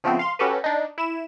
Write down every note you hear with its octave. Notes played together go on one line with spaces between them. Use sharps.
C#3 F3 A3 B3 C4
F5 C6
C#4 F#4 G4 A4 B4
D4 D#4
E4 E7